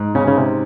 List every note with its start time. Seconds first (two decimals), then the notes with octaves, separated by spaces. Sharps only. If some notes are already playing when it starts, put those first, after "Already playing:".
Already playing: G#2
0.15 C#3 C#4
0.28 C#3
0.37 C3